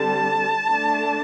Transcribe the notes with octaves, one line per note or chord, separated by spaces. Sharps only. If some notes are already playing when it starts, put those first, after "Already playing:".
Already playing: D3 G3 C4 A5
D3 A3 D4